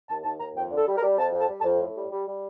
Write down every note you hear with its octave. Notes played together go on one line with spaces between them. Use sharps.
D#2 A5
D#2 A5
D#2 A#5
F2 G5
D3
A4
G3
A#4
G3
F2 A5
F2
A5
G3
A5
F2
A2
G3
G3
G3